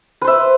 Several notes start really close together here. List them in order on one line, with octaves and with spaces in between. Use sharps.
B4 C5 E5